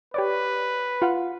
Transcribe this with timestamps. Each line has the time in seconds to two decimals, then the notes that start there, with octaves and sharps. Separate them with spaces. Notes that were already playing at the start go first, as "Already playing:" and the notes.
0.14 G4 B4 C#5 D5
1.02 F4 F5 F#5